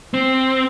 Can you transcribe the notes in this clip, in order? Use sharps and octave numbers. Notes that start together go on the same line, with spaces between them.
C4